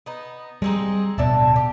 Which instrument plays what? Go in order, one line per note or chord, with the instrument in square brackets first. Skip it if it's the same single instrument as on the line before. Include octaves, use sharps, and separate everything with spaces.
[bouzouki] B3 D#4
[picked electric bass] G3 [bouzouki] G#3 C4 D#4
[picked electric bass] D1 B2 [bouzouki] D4 E5 A5
[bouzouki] G4